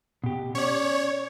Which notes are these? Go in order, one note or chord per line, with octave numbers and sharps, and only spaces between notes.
B2 G4
C#4 C#5 D5